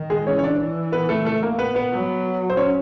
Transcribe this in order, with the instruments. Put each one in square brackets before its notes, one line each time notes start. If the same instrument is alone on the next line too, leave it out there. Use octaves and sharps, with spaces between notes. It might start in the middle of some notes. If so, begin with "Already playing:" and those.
Already playing: [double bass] D#3
[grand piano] G#3 G#4
[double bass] E3 [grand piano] C#4 C#5
[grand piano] C#5
D4 D5
[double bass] E3
[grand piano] B3 B4
A3 A4
A3 A4
A#3 A#4
B3 B4
B3 B4
[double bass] F#3
[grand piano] C5
C#4 C#5